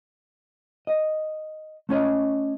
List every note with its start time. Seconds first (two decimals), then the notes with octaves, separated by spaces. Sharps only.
0.87 D#5
1.89 A3 C#4 C#5 D#5